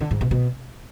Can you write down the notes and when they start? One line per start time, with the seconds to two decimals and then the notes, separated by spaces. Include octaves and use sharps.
0.01 D3
0.11 G#2
0.21 B2
0.31 B2